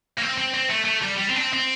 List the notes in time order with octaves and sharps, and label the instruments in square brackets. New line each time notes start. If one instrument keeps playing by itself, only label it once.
[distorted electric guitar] A#3
C4
C4
C4
A3
A3
G3
G3
C4
D4
C4
C4